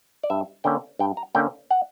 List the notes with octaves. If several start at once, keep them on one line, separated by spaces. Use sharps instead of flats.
D5
G2 E5
D3 A#3 C#4 G5
G2 G5
A#5
D3 A#3 C#4 G5
F#5